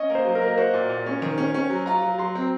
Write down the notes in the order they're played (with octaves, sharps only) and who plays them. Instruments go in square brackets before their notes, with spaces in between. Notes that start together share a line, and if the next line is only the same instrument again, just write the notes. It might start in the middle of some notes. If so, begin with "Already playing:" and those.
Already playing: [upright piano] C#4 [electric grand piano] D#5
[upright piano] A#3
[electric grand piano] C5
[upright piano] F#3
[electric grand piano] A#4
[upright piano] A#3
[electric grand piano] A#4
[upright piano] F#4 [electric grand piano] C5
[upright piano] A#2
A#2
C#4
D#3
C#4
C#4
F#3
[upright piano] F4 [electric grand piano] A#5
[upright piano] F#3
[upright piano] F#3 [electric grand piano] C6
[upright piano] C4